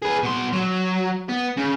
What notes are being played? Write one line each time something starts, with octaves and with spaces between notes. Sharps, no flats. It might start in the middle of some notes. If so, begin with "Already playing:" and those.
G#4 B4
B2 C6
F#3
B3
C#3